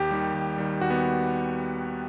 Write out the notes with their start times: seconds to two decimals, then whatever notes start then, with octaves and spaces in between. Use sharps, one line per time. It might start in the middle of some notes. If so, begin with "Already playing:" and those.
Already playing: D#2 G4
0.11 D#3 G3
0.34 D#2
0.58 D#3 G3
0.81 D#2 F#4
0.90 B3